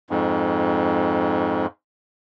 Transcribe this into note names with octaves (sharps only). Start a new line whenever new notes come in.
F2 G#2